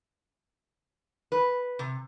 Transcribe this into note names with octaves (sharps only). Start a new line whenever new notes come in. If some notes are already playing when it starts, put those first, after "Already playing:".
B4
C3